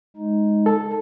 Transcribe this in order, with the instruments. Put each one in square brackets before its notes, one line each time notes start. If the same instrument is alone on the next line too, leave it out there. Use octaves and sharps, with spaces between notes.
[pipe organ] G#3 D#4
[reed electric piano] A4